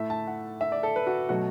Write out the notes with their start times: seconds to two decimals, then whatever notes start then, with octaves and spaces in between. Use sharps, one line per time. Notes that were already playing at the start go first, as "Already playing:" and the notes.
Already playing: A2 A3 E5
0.10 A5
0.27 F#5
0.61 E5
0.72 D5
0.83 A4
0.96 B4
1.07 F#4
1.29 B2 F#3 A3 F#4